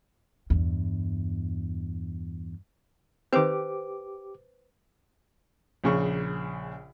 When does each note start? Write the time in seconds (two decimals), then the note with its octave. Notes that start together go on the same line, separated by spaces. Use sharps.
0.50 E2 G2
3.33 D#3 C4 G4 B4 C5 D6
5.84 A#1 C#3 C#6